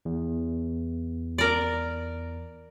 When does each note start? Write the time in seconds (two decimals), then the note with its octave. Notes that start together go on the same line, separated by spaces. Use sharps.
0.05 E2
1.38 A#4 D5